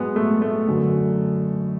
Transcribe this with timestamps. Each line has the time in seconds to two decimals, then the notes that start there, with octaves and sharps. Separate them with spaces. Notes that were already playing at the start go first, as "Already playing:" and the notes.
Already playing: G#2 F#3 G#3 B3
0.16 A3
0.42 A3
0.67 F#2 D3 F#3